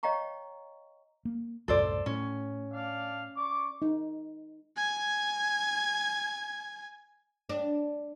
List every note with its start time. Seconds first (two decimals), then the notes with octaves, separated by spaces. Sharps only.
0.03 C#5 D#5 F5 G5 A#5 C#6
1.25 A#3
1.68 C2 F#2 A2 A4 C5 D5
2.06 A2 C#4
2.72 D4 D5 F5
3.36 D5 C#6 D6
3.82 D#4
4.77 G#5 G#6
7.49 D4